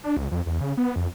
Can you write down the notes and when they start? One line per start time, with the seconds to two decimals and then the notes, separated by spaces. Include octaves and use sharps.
0.04 D4
0.17 C#2
0.31 F2
0.46 E2
0.61 C#3
0.77 B3
0.96 F2